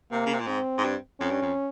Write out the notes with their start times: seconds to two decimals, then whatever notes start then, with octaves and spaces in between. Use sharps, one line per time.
0.11 C3 A#3
0.26 C#3
0.34 C3
0.40 A#2
0.47 G#2 C4
0.78 G#2
0.84 G2
1.20 F2 C#4
1.31 G2
1.42 F2